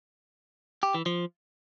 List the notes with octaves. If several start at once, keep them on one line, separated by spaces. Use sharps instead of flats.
G4
E3
F3